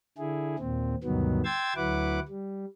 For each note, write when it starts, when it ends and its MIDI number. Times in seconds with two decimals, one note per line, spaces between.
0.18 0.56 50
0.18 0.56 64
0.18 0.56 68
0.59 0.95 39
0.59 0.95 46
0.59 0.95 60
1.04 1.42 38
1.04 1.42 43
1.04 1.42 47
1.04 1.42 51
1.04 1.42 54
1.04 1.42 59
1.44 1.74 79
1.44 1.74 84
1.44 1.74 88
1.44 1.74 92
1.44 1.74 93
1.76 2.20 38
1.76 2.20 54
1.76 2.20 64
1.76 2.20 71
1.76 2.20 78
1.76 2.20 86
2.28 2.65 55